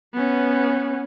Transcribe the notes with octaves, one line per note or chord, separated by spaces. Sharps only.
B3 C#4